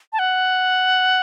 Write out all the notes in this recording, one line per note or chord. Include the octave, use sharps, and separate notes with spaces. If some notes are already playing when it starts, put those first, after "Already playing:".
A5
F#5